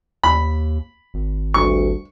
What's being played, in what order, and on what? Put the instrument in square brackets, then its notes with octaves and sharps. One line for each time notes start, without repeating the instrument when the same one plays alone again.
[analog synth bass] D#2 [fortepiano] B5
[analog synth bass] G#1
[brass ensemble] D2 G2 [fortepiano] C#6